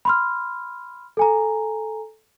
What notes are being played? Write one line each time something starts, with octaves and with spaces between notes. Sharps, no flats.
B5 C6 F6
A4 G#5 A#5